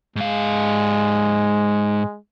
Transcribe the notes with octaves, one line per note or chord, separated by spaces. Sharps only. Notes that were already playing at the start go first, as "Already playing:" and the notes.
G#2 G#3 F5